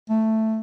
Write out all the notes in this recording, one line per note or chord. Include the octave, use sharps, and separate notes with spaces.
A3